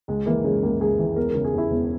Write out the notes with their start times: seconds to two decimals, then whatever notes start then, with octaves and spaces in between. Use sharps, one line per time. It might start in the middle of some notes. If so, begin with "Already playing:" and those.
0.08 C#2 G#3
0.26 E3 A#3
0.44 C#3 G#3
0.63 C#2 A#3
0.80 C#2 G#4
0.99 E3
1.16 E1 A#4
1.31 C#3 A#4
1.44 G#4
1.53 E2 E4
1.71 E1